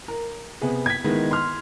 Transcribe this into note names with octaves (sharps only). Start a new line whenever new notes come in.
A#4
C3 B3 G#4
G#6 B6
D#3 G#3 B3 E4
C6 F6